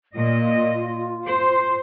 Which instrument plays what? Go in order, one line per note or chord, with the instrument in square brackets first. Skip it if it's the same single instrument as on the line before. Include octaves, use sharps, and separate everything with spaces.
[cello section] A#2 D#5 [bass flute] F4
[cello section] C5